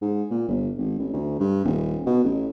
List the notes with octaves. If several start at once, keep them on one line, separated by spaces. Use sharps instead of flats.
G#2
A#2
G1
G#1
A1
D2
G2
D#1
B2
A1